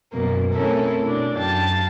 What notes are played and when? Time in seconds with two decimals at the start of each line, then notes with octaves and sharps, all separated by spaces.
0.13 F#2 B2 A#3
0.53 A3 C4 C#4 E4 A4 A#4
1.04 B2 D4
1.36 F#2 F5 G5 A5